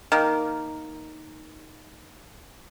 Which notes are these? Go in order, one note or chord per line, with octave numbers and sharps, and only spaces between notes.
D#3 A#3